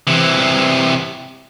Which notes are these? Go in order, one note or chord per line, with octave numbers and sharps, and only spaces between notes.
C3 E3